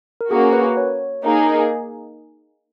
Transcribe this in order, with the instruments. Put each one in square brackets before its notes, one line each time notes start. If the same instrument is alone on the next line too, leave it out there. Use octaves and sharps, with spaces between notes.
[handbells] A#4
[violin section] A#3 C#4 F#4 [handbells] G#4
[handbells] B4
C#5
[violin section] A#3 D#4 G#4